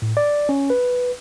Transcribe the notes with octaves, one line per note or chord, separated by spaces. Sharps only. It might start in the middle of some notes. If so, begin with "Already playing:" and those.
A2
D5
C#4
B4